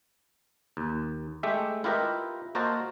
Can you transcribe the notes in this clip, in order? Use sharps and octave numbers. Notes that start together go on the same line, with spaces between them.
D#2
G#3 A3 G4 E5
E4 F4 G4 A#4 B4 D#5
A#3 F#4 A#4 C5 D#5 A5